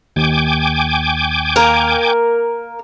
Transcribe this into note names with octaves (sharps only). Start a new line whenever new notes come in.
D#2 G5 G#5 D6
A#3 A#4